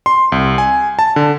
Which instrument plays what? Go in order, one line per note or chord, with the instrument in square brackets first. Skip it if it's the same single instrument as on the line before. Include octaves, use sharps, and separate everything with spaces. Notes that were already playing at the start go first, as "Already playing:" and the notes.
[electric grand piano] C6
C2
G#5
A5
D3